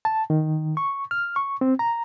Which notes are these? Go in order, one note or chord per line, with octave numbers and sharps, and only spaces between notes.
A5
D#3
C#6
F6
C#6
C4
A#5